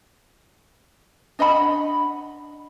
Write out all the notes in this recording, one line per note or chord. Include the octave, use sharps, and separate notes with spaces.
D4 D#5 F#5 B5